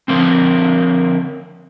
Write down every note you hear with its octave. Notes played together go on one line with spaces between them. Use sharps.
D3 F3 A#3 C4